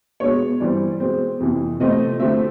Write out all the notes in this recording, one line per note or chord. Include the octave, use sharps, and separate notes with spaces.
B2 G#3 B3 D4 C#5
G2 E3 G3 C4 D5
B2 G#3 C4
F2 C3 E3
C3 F3 A3 C4 D#5
D3 F3 A3 C4 E5